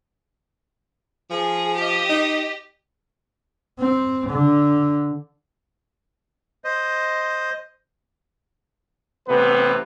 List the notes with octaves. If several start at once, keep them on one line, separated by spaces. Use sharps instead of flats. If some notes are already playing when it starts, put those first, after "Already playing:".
F3 G#4
G4 D#5
D#4
C4
D3
C5 D#5
A1 C3 B3 B4